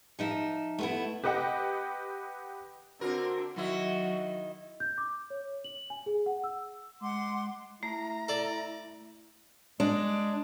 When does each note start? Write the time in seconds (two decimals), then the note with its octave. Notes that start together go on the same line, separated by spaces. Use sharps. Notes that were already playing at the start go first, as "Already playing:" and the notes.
0.19 F3 D#4 E5
0.78 A3 B3 E4
1.24 G4 B4 D#5 F#5 G5
3.01 D3 C4 F#4 A#4
3.56 D#3 F#3 E4 F#4
4.80 G6
4.98 D6
5.30 C#5
5.64 F#7
5.90 G#5
6.06 G#4
6.26 F#5
6.44 E6
7.01 G#3 F#5 C6 D6
7.29 G#3
7.83 A3 E4 A#5
8.28 A4 D5
9.80 G#3 D4